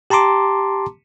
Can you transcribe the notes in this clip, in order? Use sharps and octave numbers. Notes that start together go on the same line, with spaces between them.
G4 A5 A#5 C6 D6